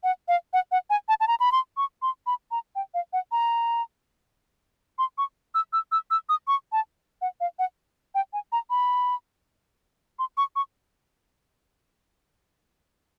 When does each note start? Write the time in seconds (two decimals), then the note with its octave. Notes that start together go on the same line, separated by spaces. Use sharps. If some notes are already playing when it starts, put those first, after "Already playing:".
0.04 F#5
0.28 F5
0.53 F#5
0.72 F#5
0.90 G#5
1.09 A5
1.20 A5
1.28 A#5
1.40 B5
1.52 C6
1.77 C#6
2.02 C6
2.27 B5
2.51 A#5
2.75 G5
2.94 F5
3.13 F#5
3.32 A#5
4.99 C6
5.18 C#6
5.55 E6
5.73 E6
5.92 E6
6.11 E6
6.29 D#6
6.48 C#6
6.72 A5
7.22 F#5
7.41 F5
7.59 F#5
8.15 G5
8.33 G#5
8.52 A#5
8.70 B5
10.19 C6
10.37 C#6
10.56 C#6